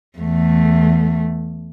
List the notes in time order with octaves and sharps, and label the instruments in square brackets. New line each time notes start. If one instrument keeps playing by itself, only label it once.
[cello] E2 A3